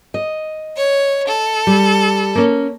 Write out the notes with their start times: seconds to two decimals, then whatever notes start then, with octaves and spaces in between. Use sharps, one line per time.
0.14 D#5
0.77 C#5
1.28 A4
1.67 G3
2.35 A#3 C#4